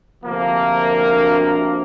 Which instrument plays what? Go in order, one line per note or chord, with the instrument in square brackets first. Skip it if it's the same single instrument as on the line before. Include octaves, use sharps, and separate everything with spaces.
[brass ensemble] D2 C3 F3 A#3